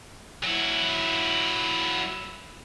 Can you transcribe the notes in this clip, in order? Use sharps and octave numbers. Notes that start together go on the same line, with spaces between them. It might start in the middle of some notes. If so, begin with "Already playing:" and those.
F#3 E4